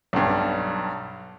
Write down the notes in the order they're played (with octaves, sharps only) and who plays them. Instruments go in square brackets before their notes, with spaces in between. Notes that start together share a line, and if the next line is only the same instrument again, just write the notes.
[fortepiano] B1 G2